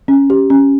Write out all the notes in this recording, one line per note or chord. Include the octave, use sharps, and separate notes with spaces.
C#4
G4
C#4